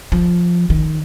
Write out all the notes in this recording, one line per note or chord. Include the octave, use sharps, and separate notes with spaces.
F3
D#3